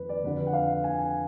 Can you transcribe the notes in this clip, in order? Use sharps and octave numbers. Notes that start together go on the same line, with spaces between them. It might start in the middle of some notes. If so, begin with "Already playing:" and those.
Already playing: F2 D#3 B4
D5
F2 D3 B4
F#5
F5
G#5
G#5